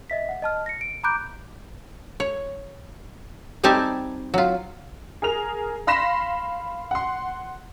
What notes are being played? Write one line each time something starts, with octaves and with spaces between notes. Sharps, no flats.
D#5 E5 B6
F#5
D#5 A5 F6
A#6 C#7
D7
A#5 B5 D6 F#6 G6 D7
C#5
G3 C4 D#4 G4 G#5 A5
F#3 F4
G#4 A#4 F7
F5 B5 C6 A#6 B6 E7
F#5 C6